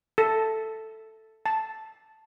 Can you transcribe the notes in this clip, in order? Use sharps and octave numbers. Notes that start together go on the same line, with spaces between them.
A4
A5